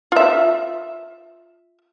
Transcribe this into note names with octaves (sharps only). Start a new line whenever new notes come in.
F4 E5